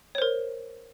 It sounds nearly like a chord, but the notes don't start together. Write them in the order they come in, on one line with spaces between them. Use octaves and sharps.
C#5 C5 A#4